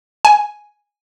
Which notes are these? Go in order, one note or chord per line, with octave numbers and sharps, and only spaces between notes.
G#5